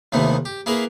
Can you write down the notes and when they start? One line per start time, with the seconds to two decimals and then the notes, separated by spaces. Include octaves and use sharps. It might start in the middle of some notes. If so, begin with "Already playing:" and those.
0.12 D#2 C3 D#3 E3 A3 B3
0.45 G4
0.66 A#3 E4 G#4 A#4 B4 F5